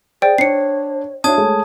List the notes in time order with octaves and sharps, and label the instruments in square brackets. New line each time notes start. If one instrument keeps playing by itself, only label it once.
[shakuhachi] G#4 [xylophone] C5 D5 G5
[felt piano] D4 [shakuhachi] C#5 [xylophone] C7 C#7
[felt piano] D4 F#4 E5 [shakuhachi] C#5 [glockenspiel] A5 D#6 G#6
[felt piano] G#3 A3 G#4